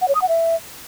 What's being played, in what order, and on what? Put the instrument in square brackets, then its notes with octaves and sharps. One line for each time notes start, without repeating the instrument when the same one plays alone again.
[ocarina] F#5
C#5
D#6
F#5
E5